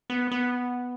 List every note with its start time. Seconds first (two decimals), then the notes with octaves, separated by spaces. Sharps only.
0.10 B3
0.31 B3